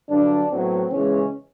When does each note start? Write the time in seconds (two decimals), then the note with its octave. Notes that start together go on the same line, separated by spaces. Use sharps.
0.09 G2 D3 F#3 D4
0.49 A2 F#3 B3 C4
0.90 E2 C#3 E3 G#3 C#4